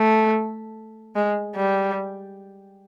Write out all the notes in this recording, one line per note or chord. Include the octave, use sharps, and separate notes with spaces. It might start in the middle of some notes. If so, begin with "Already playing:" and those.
Already playing: A3
G#3
G3